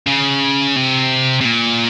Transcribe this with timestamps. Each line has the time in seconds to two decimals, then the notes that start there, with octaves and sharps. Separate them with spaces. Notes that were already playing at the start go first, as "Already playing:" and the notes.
0.07 C#3
0.76 C3
1.41 C3
1.45 A#2